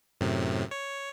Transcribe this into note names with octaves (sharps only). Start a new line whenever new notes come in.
F#2 A2 C3
C#5